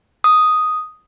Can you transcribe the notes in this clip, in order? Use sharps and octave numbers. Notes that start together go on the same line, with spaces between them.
D#6